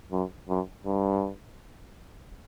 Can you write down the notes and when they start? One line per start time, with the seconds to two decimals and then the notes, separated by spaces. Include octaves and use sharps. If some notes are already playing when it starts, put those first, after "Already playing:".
0.12 F#2
0.49 F#2
0.86 G2